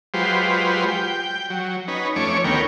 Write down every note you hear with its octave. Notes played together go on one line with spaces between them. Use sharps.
F#3 G#3 F4 G4 B4 C5
G5
F#3
C#4 D#4 B4
F2 A3 C#4 C#5 D6
D2 D#3 B3 A#4 C#5 G5